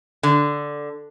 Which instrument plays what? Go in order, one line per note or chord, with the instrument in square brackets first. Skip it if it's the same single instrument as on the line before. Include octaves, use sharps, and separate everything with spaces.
[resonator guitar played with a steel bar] D3